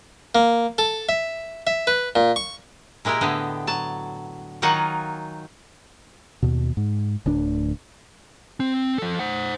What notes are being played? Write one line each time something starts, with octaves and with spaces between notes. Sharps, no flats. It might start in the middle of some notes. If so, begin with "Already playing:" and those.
A#3
A4
E5
E5
B4
A#2
C#6
A#2 G#3 E4 G4 A#4
A2 D3 B3 G4 D#5
F#3 A5
D#3 F#3 D#4 F4 F#5 G#5
D#2 B2
G#2
D1 D2 D4
C4
F3 A4
C5 F#5